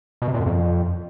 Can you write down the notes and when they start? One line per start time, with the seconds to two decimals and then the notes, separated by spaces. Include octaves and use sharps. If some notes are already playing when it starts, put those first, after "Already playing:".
0.22 B2
0.28 C3
0.34 A#2
0.40 F#2
0.46 F2